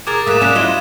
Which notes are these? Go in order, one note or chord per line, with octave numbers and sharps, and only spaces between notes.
G#4 A#4 D6 G#6 A6
A3 A#3 D#6 F#6 E7
C#4 D4 F#5
F#3 E4 F4 D#5